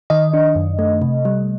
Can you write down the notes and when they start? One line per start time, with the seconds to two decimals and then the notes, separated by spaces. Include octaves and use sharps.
0.10 D#3 D#5
0.34 D4
0.55 F#2
0.79 A3
1.02 C3
1.25 G3